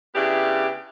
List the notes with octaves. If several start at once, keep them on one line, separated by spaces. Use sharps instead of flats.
C#3 B3 D4 E4 G4